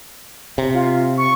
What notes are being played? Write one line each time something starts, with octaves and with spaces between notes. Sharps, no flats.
C3
F4
C#6